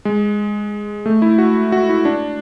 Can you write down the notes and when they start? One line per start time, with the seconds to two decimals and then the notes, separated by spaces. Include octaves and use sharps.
0.05 G#3
1.06 A3
1.22 E4
1.38 F#4
1.72 F#4
1.89 E4
2.05 D4